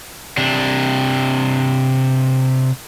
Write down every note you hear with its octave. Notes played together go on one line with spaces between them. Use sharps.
C3 D4